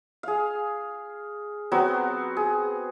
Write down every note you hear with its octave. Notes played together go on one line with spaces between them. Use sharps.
G#4 F5
F#3 B3 C4 F#4
G#4